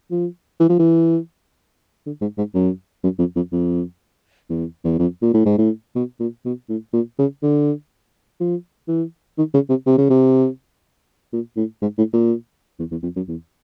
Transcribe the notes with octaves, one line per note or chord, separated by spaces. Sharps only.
F3
E3
F3
E3
D3
G#2
G#2
F#2
F#2
F2
F2
F2
E2
E2
F2
A#2
A2
G#2
A2
B2
A#2
B2
A2
A#2
C#3
D3
F3
E3
D#3
C#3
C3
C3
C#3
C3
A#2
A2
G#2
A2
A#2
E2
E2
F2
F#2
E2